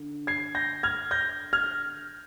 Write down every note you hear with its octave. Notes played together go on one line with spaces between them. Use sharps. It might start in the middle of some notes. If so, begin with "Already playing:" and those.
Already playing: D3
G#6 C7
G6 A#6
F6 G#6
G6 A#6
F6 G#6